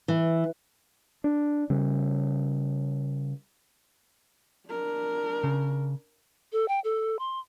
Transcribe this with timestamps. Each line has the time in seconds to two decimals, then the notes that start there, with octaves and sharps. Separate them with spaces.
0.08 E3
1.24 D4
1.70 C#3 G3
4.69 D4 A#4
5.43 C#3
6.53 A4
6.68 G5
6.84 A4
7.19 C6